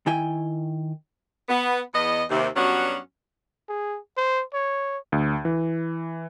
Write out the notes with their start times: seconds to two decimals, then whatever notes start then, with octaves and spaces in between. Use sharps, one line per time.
0.06 D#3 E4 G5 G#5
1.49 B3
1.93 E2 B3 D#5
2.30 D#2 C3
2.56 G2 F#3 B3 C#4 D4 F#4
3.69 G#4
4.17 C5
4.53 C#5
5.12 D2
5.45 E3